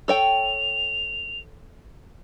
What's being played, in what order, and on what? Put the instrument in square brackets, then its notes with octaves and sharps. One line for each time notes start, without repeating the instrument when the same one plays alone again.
[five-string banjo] A4 C#5 G5 [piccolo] F7